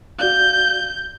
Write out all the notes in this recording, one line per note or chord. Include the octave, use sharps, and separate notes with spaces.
F#4 D5 F5 G6